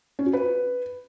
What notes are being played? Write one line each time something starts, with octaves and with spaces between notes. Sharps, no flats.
C#4
F#4
B4